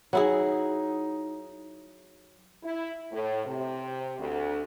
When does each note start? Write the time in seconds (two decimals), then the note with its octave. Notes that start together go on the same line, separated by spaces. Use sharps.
0.13 F#3 D#4 E4 G#4
2.63 E4
3.11 A2
3.45 C3
4.19 D2